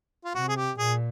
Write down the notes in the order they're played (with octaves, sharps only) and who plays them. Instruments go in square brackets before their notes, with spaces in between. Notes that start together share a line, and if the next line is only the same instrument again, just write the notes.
[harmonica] F4
[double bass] C3 [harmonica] F#4
[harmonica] G#4
G4
[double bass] A#2 [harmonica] G#4